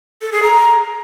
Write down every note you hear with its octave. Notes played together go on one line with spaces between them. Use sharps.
A4
G#4
A#5